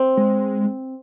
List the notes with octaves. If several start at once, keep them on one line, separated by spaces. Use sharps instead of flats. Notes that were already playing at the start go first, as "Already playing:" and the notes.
Already playing: C4
G#3